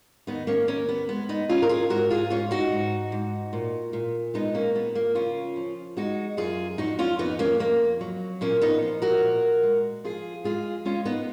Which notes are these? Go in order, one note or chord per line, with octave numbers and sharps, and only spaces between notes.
D#2 B3 D#4
A#3 C#4
D#2 A#3 C#4
B3
G#3 B3
B3 D#4
D#2 C#4 F4
A#4
F4 G#4
G#2 F#4 A#4
F4 G#4
G#2 C#4 F4
D#4 F#4
G#2
G#2
A#2
A#2
G#3 B3 D#4
A#3 C#4
A#2 B3
A#3
C#3 C#4 F4
F3
G#3 D#4 F#4
F#2 F4 G#4
F2 D#4 F#4
C#4 F4
F2 B3 D#4
A#3 C#4
F2 A#3
F#3
A#2 A#3 C#4
B3 D#4
F3
F#4 A#4
A#2
G#3
F3 F4 G#4
G#3 F4 G#4
G#3 C#4 F4
B3 D#4